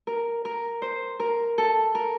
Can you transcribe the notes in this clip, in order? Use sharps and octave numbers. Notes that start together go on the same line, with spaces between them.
A#4
A#4
C5
A#4
A4
A#4